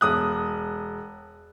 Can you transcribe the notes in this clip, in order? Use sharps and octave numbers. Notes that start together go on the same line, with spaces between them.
E1 D#6 F#6